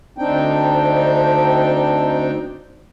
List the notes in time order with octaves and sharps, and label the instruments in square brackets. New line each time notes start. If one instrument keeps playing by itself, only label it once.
[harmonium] D2 C4 D4 D#4 G5